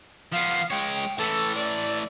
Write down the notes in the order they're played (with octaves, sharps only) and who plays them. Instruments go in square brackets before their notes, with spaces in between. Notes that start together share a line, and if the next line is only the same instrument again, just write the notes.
[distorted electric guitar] F3 B3 [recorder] F5
[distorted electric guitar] G#3 C#5 [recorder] G5
[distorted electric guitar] A2 E3 [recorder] A4
[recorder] D5